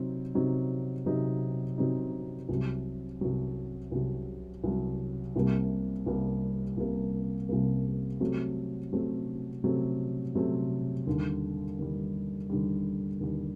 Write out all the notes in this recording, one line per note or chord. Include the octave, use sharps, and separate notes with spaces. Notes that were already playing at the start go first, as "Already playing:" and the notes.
Already playing: C3 F#3 C4 D#4
C3 F#3 C4 D#4
C3 F#3 C4 D#4
C3 F#3 C4 D#4
C2 C3 F#3
C2 C3 F#3
C2 C3 F#3
C2 C3 F#3
C2 C3 G3 A#3
C2 C3 G3 A#3
C2 C3 G3 A#3
C2 C3 G3 A#3
C3 F#3 A3 C4
C3 F#3 A3 C4
C3 F#3 A3 C4
C3 F#3 A3 C4
D#2 D3 G3
D#2 D3 G3
D#2 D3 G3
D#2 D3 G3